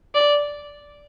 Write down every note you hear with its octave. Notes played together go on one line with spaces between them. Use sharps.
D5